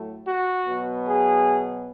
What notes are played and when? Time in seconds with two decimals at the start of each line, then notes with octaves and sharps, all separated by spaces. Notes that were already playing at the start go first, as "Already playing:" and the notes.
Already playing: A2 F#3 A3
0.25 F#4
0.65 B2 F#3 B3
1.04 G#4